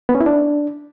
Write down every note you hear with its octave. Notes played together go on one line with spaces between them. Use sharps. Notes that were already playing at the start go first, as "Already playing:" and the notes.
B3
C#4
E4
D4